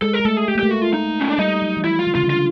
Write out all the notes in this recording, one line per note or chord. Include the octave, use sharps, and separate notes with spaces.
G#3 A4
A#4
G#3
A3 A4
G#4
A3 G4
A#3
A3 G4
F#4
F4
D#4
C#4
D4
G3 D#4
F#3
E3
F3 E4
F4
D3
C#3 F4
D3
F4